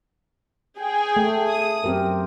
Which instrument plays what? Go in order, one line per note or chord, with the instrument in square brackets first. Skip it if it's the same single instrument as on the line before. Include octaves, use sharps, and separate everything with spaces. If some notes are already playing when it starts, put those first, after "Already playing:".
[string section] G#4 G5
[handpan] A3
[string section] D#6
[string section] F#2 [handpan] C4 G4 A#4